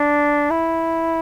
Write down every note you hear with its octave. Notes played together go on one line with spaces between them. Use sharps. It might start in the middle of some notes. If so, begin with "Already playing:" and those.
Already playing: D4
E4